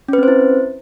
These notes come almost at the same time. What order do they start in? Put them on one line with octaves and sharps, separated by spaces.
C#4 B4 C4 C5 E4